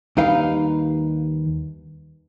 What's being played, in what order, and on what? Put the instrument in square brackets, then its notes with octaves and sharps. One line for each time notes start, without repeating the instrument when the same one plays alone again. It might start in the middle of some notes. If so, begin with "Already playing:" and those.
[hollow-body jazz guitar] D#2 G3 D#4 B4 F5